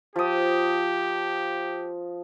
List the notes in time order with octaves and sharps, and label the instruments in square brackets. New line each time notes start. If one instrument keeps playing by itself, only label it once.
[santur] F3 D#6 [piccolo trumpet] G4